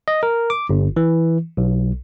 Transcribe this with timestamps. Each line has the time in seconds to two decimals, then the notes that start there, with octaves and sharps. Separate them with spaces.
0.08 D#5
0.23 A#4
0.50 D6
0.69 G1
0.97 E3
1.57 B1